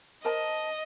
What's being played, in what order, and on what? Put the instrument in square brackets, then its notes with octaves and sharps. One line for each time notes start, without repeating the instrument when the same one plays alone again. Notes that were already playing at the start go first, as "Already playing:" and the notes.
[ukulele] A#4 C5 A5 [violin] D#5